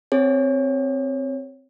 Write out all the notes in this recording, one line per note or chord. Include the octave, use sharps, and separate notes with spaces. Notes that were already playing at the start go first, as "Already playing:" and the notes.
C4 G#4 C#5